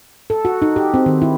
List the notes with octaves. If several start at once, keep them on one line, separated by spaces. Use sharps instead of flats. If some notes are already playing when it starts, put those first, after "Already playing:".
A4
F#4
D#4
G4
C4
D#3
E4